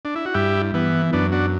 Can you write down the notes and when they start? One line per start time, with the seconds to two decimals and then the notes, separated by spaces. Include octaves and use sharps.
0.05 D4
0.15 E4
0.25 F#4
0.34 G2 E4 G4
0.74 E3 B3
1.13 F#2 B3 D4
1.32 D4 F#4